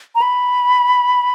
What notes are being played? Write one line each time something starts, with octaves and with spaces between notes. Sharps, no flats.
A#5
B5